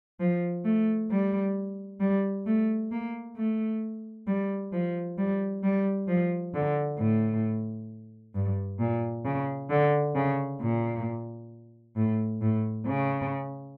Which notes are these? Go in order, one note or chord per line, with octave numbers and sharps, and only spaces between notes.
F3
A3
G3
G3
A3
A#3
A3
G3
F3
G3
G3
F3
D3
A2
G2
A#2
C#3
D3
C#3
A#2
A2
A2
C#3